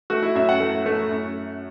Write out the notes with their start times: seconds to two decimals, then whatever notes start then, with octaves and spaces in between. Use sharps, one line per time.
0.10 A3 F#4
0.22 E4
0.35 F#2 E5
0.49 F#5
0.60 A3
0.86 A3
1.11 F#2